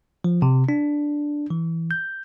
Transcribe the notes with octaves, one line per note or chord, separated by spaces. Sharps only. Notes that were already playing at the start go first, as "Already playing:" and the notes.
F3
C3
D4
E3
G6